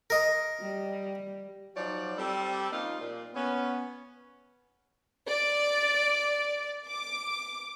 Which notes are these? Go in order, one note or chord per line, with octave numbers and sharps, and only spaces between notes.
A#4 D#5
G3
F3 F#3 D#4 C#5 D5
G3 C4 A4
F3 A#3 C#4 D#4 F4 F5
A#2
B3 C#4
D5
D6